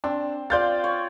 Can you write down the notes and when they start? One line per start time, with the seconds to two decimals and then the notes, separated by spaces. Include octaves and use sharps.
0.04 C4 D4
0.50 F4 C5 D5 F5 G6 A6
0.84 C#5